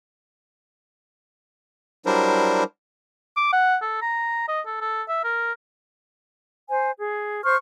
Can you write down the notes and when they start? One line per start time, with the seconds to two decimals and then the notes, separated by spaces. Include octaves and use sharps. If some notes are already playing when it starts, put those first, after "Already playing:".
2.06 F#3 G3 D4 E4 A#4 C5
3.37 D6
3.53 F#5
3.82 A4
4.02 A#5
4.48 D#5
4.66 A4
4.81 A4
5.08 E5
5.24 A#4
6.69 C5 G#5
6.97 G#4
7.44 C5 C#6 F6